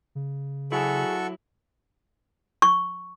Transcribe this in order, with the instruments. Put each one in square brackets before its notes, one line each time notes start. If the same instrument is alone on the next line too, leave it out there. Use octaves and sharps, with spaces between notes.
[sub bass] C#3
[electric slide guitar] F#3 E4 [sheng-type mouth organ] F#4 A4 C#6 [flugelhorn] G#4
[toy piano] C#6